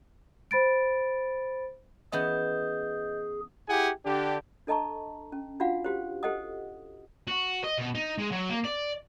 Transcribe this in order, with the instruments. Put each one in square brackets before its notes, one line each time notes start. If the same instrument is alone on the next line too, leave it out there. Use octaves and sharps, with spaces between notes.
[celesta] C5 B5 A6 D7
[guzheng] E3 B3 C#4 [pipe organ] G#4 [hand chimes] D#5 G6
[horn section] E4 G4 G#4 F#5 G#5
D3 D4 G4
[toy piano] D4 A4 D#5 A5 A#5 C#6
C#4
D4 F4 F#4 F5 F#5
F#4 G4 C5
G4 A4 C5 D#5 F#5 D#6
[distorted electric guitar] F#4
D#5
B2
D#4
G#3
F#3
A#3
D5